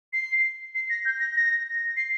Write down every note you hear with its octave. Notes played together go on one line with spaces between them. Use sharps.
C7
C7
A#6
G6
A#6
A#6
C7